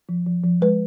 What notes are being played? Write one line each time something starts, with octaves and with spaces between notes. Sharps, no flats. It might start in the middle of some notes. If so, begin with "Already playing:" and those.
F3
F3
F3
G#3 B4